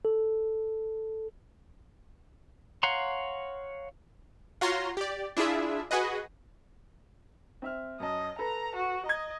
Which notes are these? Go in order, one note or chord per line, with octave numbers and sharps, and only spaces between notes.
A4
C#5 F5 F#5 A#5 C6
F4 F#4 C#5 A#5 C6
G4 D5
D4 E4 F4 G#4 E5
F#4 G#4 B4 D#5
C4 E5 F6
F#2 D#5 A5
A4 B4 A#5
F#4
D#5 A#5 G#6